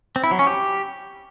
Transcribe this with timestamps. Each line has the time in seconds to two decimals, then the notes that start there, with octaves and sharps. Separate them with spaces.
0.16 C4
0.24 E4
0.31 F#3
0.39 C#4
0.47 G4